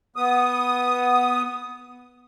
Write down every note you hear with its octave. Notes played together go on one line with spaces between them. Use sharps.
B3 D#6